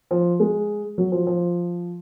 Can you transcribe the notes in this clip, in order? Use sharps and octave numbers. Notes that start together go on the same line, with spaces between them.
F3
G#3
F#3
F3
F3